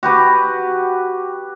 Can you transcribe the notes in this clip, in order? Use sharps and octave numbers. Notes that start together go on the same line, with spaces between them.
F#4 G4 B4